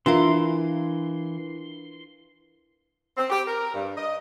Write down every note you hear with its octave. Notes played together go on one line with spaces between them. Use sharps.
E3 D4 F4 A#4 E5 F5 C6
C4
G4
A#4
G2
D#5